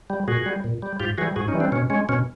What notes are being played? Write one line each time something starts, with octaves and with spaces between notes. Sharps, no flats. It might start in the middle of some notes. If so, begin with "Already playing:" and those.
G3
A#2 F#4 G#4
G3
A#2
G3
G#2 F4 G4
E3 G3 F#4 G#4
G#2 F#4 G#4
C#4 D#4
E3 G3
C4 D4
B2 C#4
G#3 C#4
B2 C#4